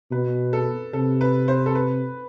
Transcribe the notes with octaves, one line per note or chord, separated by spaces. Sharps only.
B2 B4
A4
C3 A4
B4
C5
A4
B4